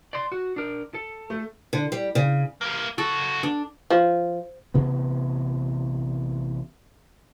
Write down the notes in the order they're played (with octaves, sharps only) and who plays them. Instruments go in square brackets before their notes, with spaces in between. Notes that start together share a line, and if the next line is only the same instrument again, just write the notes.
[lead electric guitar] D5 C6
F#4
D4 A#4
A4
[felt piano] A3
[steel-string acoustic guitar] D3
G3
C#3
[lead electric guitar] G3 A#3
[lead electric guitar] C#3 F#4 [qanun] A4
[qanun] D4
[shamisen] F3
[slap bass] A1 C3 B3